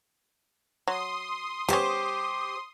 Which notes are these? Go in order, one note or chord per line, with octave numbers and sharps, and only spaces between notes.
F#3 C6 D#6
G3 B3 C#4 G4 C5 D6